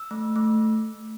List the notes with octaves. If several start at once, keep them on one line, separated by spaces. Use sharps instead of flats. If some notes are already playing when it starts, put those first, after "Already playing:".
Already playing: E6
A3
A3